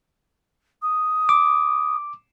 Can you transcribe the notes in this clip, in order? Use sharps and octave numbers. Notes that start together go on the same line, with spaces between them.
D#6
D6